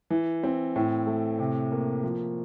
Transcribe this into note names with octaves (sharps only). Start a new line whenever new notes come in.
E3
C4
A2
A3
C3
A#3
F3